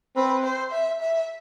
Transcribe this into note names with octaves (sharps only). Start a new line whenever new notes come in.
C4 B4
C5
E5
E5